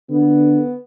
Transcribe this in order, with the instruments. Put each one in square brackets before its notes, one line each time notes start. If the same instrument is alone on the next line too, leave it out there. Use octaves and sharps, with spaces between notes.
[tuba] D3 [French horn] B3